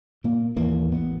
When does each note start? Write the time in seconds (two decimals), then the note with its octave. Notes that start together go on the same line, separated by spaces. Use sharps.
0.24 A#2 A#3
0.56 D#2 A2 E3 A#3
0.92 A1 B3